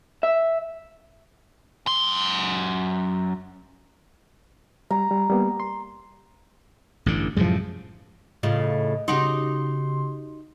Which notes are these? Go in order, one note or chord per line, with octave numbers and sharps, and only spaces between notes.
E5
F#2 C6
G3 A#5
G3
G3 A#3 B3
C6
A1 G2 D3
F#2 A2 C3 F3 G#3
A2 C#3 F4 D#5
C#3 D#4 F#4 G4 C6